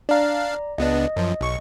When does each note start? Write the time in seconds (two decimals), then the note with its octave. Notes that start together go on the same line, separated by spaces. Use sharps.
0.09 D4 D5 F5 A#5
0.78 C#2 B3 D4 D#5
1.16 F#2 F3
1.41 B1 C#6